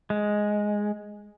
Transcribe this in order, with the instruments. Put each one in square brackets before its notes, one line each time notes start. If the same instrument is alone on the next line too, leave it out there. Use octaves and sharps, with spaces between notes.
[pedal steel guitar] G#3